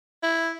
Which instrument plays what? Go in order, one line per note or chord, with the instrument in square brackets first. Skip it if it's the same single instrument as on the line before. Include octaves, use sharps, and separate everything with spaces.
[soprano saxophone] E4